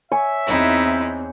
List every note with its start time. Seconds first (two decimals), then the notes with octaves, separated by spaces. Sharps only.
0.12 C#5 E5 G#5
0.47 E2 C4 D#4 E4